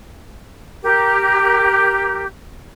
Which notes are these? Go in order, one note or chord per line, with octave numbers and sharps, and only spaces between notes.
G4 A#4